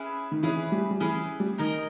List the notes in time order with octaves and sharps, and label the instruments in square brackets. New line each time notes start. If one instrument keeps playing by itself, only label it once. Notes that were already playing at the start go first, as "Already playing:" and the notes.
Already playing: [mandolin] C#4 E4 G#4 B4
[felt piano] D#3
[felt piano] E3 [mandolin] C#4 E4 G#4 B4
[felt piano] G3
G3
[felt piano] E3 [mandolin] C#4 E4 G#4 B4
[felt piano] G3
[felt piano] D#3 [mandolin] D#4 A#4 D#5 G#5